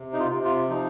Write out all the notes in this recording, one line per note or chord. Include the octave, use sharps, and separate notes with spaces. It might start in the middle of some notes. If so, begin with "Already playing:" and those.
Already playing: C3
D#4
F4
C3
F4
F3 D#4